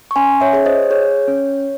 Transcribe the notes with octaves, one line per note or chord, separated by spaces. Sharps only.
C#6
C#4 G#5 C6
C#5 E5
G#4 C#5
C5 D#5
G#4 C#5
C#4